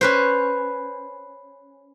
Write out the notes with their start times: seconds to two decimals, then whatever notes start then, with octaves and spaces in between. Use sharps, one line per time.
0.01 C#4 B4 C5